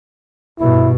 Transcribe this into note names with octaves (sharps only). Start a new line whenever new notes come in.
G2 B2 E4